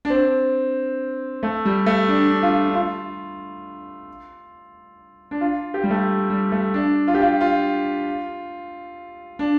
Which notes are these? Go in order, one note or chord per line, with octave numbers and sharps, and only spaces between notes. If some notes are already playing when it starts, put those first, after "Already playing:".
D4
C4
A3
G3
A3
D4
D4
F4
D4
F4
D4
F4
G4
G3
A3
G3
A3
D4
F4
G4
F4
F4
D4